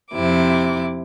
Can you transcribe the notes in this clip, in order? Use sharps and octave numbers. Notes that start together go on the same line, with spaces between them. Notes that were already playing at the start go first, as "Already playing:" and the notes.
F2 C3 E4 D6